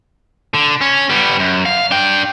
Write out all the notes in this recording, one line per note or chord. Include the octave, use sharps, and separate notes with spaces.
D3
C#4
G3 B3
F#2
F5
D4 G5